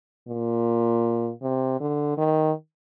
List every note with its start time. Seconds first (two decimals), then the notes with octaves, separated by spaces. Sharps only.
0.28 A#2
1.42 C3
1.80 D3
2.18 D#3